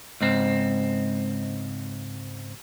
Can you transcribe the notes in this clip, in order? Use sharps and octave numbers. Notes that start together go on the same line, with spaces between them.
C#2 G#2 C4